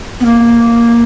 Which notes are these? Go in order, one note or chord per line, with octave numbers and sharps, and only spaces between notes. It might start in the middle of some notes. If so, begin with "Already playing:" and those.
B3
A#3